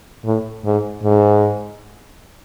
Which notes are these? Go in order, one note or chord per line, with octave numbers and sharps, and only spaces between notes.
A2
G#2
G#2